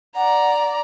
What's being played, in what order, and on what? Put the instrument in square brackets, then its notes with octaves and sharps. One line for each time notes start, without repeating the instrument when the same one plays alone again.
[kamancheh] D5 A#5 [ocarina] F#5